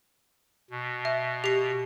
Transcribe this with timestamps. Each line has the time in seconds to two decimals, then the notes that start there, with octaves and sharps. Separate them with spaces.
0.71 B2
1.05 E5
1.44 G4 C7